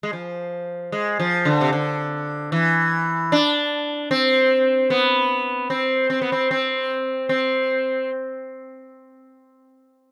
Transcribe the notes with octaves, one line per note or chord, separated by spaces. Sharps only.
G#3
F3
G#3
F3
D3
C3
D3
E3
D4
C4
B3
C4
C4
B3
C4
C4
C4